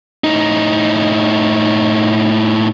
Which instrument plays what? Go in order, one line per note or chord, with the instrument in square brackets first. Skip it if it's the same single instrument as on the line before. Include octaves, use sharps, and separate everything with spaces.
[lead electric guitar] A2 D#4